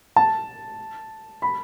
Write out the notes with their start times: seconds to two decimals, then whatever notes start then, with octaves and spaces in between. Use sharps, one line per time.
0.16 A5
1.42 B5